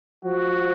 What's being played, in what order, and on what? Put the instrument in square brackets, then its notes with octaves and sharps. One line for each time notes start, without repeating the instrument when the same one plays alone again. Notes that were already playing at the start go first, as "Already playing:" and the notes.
[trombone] F3 [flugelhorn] F#4